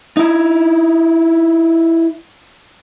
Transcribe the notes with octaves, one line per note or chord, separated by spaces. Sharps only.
D#4 E4